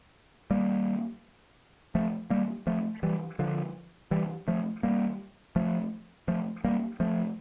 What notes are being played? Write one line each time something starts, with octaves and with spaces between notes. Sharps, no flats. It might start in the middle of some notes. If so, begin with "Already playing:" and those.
G3 A#3
F3 A3
G3 A#3
F3 A3
E3 G3
D3 F3
E3 G3
F3 A3
G3 A#3
F3 A3
F3 A3
G3 A#3
F3 A3